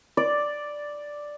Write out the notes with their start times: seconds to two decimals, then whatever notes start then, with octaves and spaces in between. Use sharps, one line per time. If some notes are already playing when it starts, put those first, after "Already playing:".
0.17 D5